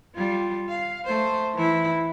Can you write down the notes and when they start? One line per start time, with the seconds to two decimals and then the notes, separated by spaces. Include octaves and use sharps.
0.16 G3 F4
0.69 F5
1.05 A3 C5
1.54 E3 E4